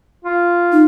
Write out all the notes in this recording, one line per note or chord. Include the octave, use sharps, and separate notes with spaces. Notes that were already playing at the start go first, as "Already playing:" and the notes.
F4
D#4